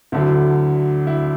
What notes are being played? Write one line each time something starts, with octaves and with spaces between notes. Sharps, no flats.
D2 D3 F#3 E4
E4